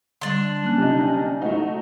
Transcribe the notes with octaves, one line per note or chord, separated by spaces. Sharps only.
D3 G3 D4 C6
F#3 A#3 C#4 F#6
C3 D#4
A3 D#4 E4 F#4 C5 F#5